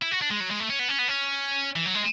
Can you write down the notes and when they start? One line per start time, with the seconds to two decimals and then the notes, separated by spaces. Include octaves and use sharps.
0.02 E4
0.11 F#4
0.22 D4
0.30 G#3
0.40 F#3
0.51 G#3
0.60 A3
0.70 C#4
0.79 B3
0.88 C#4
0.99 B3
1.08 C#4
1.76 E3
1.86 F#3
1.95 G#3